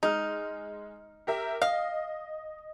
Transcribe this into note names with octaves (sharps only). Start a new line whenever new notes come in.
G#3 D#4 F6
G4 A#4 E5
D#5 F5